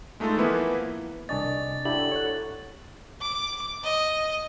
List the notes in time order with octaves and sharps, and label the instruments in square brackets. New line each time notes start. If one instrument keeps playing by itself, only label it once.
[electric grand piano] G#3 A3 D#4 F4 A4
E3 F3 A#3 B3 E4 B4
[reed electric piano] C2 D4 D#5 [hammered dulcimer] D5 G#5 C#6 [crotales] A6
[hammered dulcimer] D3 F#3 [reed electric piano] D4 E4 G4 [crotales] F#7
[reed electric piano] C#5 F#6
[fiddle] D6
D#5